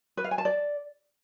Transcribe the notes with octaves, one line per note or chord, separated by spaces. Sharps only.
B4
F5
G#5
A5
D5